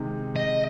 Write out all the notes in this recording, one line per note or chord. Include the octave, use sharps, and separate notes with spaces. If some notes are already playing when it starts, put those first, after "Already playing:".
Already playing: C3 D#3 G#3 D#4
D#5